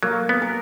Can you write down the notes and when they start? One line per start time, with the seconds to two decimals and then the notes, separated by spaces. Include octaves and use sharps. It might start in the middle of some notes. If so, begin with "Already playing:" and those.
0.03 F#3 A#3
0.29 B3
0.42 A#4